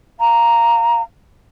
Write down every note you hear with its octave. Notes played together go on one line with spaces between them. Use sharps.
F5 A#5